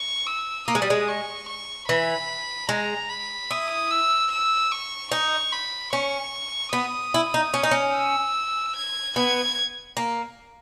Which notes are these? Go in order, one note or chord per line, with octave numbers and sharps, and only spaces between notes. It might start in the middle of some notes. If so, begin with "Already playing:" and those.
Already playing: C#6
E6
A#3 D#6
G#3
G3
G#3
C#6
C#6
E3 B5
G#3 A#5
B5
E4 D#6
E6
E6
C#6
D#4 C#6
B5
C#4 C#6
B3 D#6
E4
D#4
C#4
D#4
C#4
E6
G#6
B3 G#6
A#3